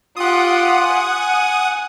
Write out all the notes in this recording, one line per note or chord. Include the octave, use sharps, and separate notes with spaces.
F4 G4 F#5 D#6
G#5